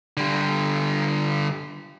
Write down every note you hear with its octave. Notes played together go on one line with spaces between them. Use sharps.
D3 G3